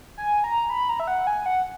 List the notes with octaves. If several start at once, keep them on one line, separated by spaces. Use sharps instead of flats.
G#5
A#5
B5
A#5
E5
F#5
G#5
F#5